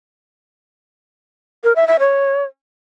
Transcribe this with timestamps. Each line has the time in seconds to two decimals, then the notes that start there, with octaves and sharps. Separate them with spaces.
1.64 A#4
1.76 E5
1.87 E5
1.99 C#5